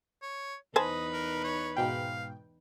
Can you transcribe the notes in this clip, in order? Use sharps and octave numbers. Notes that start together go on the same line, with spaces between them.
C#5
E2 D#4 B4 C5 D#5 G#5 A5
A#4
C#5
G#2 B2 F5 G5